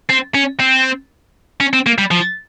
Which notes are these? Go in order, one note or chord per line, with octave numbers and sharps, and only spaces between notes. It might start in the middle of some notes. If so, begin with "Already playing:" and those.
C4
C#4
C4
C#4
C4
A#3
G3
F3